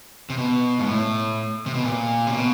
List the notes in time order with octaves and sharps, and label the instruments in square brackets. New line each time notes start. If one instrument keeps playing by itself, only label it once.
[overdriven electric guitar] C3
B2
G#2
A2
C3
B2
A#2
C3
B2